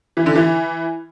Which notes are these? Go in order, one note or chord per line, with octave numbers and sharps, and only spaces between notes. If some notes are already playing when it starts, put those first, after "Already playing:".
E3
D3
E3